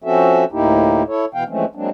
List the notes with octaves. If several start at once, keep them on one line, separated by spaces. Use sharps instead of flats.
F3 C4 C#4 F#4 A4 E5
D2 A2 A#3 D#4 E4 G4
E4 A4 C#5
B2 E3 B3 F5 G5
E3 F3 G#3 A3 C4 C#4
F#3 G#3 A#3 C4 D4